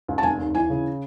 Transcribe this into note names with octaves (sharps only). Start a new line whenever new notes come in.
C#2
A5
F1 G#5
D#2
E3 G#5
C#3